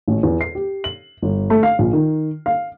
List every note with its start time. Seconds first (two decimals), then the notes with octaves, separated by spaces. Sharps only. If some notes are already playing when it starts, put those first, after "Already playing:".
0.08 A1
0.23 E2
0.41 C7
0.55 G4
0.84 F#7
1.22 G1
1.50 A3
1.63 F5
1.79 A#1
1.93 D#3
2.46 F5